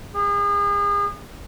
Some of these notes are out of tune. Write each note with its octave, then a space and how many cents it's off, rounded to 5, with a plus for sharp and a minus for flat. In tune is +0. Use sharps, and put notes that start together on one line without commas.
G#4 -35